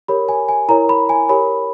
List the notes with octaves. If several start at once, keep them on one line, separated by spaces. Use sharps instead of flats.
G4 A#4 C#5 B5
G#5
G#5
E4 A#4 C#5 A#5
B5
G#5
G4 A#4 C#5 B5